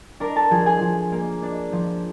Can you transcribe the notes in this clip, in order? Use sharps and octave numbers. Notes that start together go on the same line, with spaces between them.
D4 A#4 A#5
A4 A5
F3 G#4 G#5
G#4 G#5
F3
A#3
D4
F3